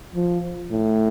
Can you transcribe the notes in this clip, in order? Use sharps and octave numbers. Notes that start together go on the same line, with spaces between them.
F3
A2